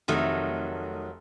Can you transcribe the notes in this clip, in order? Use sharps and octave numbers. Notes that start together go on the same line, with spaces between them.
F1 D#3 F#3 A3